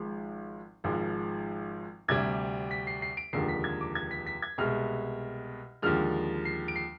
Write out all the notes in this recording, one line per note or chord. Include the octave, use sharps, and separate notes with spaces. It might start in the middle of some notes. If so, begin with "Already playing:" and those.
Already playing: G#1 G#2 F3 G#3
G#1 G#2 F3 G#3
D2 C3 G3 G#6
B6
C7
C7
D7
F1 D#2 D3 F3 G#3 C7
B6
G#6
D6
G#6
B6
B6
G#6
C2 B2 G#3 F6
D#2 D3 F3 G#3 F6
C7
D7
C7